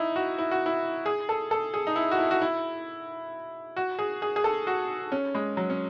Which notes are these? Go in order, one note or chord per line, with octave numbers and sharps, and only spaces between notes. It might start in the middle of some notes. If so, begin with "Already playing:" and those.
Already playing: D#4 E4
F#4
E4
F#4
E4
G#4
A4
A4
G#4
D#4
E4
F#4
E4
F#4
E4
F#4
G#4
G#4
G#4
A4
F#4
C#4
G#3
F#3
C#4